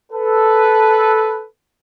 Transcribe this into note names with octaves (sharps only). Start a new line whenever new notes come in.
A4 B4